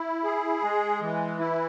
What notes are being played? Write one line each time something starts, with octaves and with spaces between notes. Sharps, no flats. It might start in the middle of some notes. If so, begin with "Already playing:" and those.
Already playing: E4
G#4
G#3
E3
E4